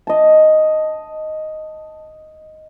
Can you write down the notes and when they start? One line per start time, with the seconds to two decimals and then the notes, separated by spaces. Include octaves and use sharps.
0.07 D#5 A5